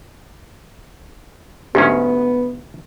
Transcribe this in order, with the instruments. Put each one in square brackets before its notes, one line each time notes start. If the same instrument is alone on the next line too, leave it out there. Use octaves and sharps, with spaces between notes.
[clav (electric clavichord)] D2 G#2 C#4 [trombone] B3 [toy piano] G4